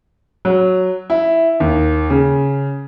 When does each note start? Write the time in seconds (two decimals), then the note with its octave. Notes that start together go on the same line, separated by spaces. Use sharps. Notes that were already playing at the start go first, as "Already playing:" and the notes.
0.45 F#3
1.10 E4
1.60 D#2
2.10 C#3